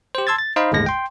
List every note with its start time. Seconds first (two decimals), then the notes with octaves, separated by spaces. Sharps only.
0.15 G4 C5
0.27 A5 C6 E6 G#6 A6
0.39 A6
0.56 D#4 C5 D#5 F5 B5
0.72 G1 D#2 A2 G#3 A#6
0.86 G5 C6